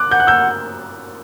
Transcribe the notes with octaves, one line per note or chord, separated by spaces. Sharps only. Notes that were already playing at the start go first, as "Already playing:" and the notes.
Already playing: D6 F#6
F#5 G6
F#6
E6 G6